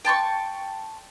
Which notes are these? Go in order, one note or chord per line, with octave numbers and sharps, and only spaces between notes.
G5 A5 C6 C#6